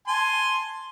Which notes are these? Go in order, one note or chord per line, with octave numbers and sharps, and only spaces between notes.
G#5 A5 C6